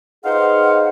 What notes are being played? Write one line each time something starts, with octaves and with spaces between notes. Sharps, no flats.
D#4 G#4 B4 C5 F5 F#5